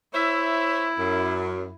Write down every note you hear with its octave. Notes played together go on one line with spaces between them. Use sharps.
E4 C5 C#5 E5
F#2